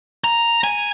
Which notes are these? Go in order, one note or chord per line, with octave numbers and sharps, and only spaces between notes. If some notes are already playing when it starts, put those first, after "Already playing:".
A#5
G#5